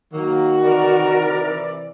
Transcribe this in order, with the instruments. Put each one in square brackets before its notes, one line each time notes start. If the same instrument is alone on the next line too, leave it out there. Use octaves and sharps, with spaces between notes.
[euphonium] D#3 [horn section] F#3 A#3 [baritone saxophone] F#4
[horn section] C3 E3 D5 [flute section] A#4